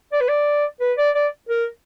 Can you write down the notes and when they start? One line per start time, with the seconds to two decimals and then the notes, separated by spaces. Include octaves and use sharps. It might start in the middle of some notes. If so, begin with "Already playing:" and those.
0.13 D5
0.21 B4
0.28 D5
0.81 B4
0.98 D5
1.15 D5
1.49 A#4